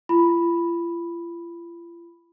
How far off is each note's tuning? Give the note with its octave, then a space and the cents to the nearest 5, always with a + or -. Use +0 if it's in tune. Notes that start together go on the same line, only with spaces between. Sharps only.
F4 -45 B5 +0